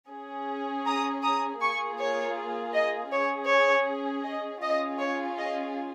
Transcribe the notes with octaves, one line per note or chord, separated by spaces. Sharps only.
C#4 G#4
A#5 D#6
A#5 D#6
A#3 F4 G#4 G#5 C#6
C#5
D#5
C#4 G#4 C#5
C#5
D#5
C#4 F4 G#4 D#5
C#5
D#5